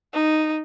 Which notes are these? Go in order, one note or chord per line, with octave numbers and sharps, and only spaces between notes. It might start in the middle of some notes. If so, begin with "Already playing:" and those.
D#4